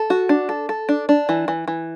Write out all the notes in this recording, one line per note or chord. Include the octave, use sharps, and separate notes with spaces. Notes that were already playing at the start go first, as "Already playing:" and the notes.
Already playing: A4
F#4
D4
A4
A4
D4
D4
E3
E3
E3